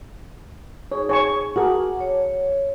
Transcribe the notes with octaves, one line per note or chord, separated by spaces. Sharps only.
D#4 G#4 C#5
C#5 G#5 C#6
F#4 G#4 A#4 F#5 A5 D6
C#5